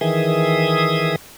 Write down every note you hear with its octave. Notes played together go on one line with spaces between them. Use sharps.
D#3 E3 G#4 E5 D#6